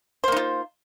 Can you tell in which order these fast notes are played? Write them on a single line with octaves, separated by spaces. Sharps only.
C5 A#3 D#4 F4